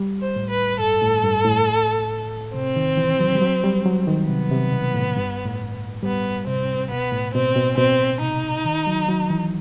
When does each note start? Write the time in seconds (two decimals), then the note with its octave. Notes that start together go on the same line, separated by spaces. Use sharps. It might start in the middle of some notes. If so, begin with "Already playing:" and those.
Already playing: G3
0.21 C5
0.36 A2
0.50 B4
0.80 G2 A4
1.02 A2
1.24 G2
1.45 A2
2.55 C3 C4
2.76 D#3
2.97 E3
3.19 F#3
3.35 G3
3.42 F#3
3.63 G3
3.86 F#3
4.07 D#3
4.29 C3 B3
4.51 C3
4.72 B2
4.94 A2
5.17 G2
5.45 A2
6.03 G3 B3
6.47 C3 C4
6.91 B2 B3
7.12 A2
7.34 B2 C4
7.56 B2
7.78 B2 C4
8.21 C3 D#4
8.65 D#3
8.87 F#3
9.09 F#3
9.30 E3